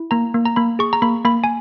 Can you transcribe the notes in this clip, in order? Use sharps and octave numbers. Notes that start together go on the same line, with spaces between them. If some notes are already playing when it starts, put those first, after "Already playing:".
Already playing: E4
A#3 A#5
A#3
A#5
A#3 B5
G#4 C#6
A#5
A#3 B5
A#3 B5
G#5